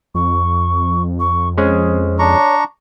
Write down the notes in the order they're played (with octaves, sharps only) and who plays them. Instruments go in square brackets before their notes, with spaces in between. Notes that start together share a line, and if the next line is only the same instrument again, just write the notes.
[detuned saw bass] F2 [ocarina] C#6
[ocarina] C#6
[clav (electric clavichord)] G#3 C#4 G#4 [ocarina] C5
[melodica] D4 A#5 C#6 [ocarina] C#5